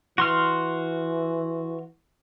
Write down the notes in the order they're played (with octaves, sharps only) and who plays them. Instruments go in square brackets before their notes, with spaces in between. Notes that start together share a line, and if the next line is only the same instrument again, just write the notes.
[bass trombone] E3 [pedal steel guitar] F#4 C6 F6